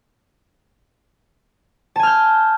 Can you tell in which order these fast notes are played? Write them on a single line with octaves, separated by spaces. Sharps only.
A5 G#5 F6 G6